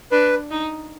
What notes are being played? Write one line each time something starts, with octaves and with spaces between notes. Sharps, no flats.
D4 B4
D#4